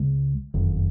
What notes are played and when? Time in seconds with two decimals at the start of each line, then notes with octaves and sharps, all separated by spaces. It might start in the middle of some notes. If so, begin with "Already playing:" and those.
Already playing: C#2 C#3 G#3
0.54 F#1 F2 D#3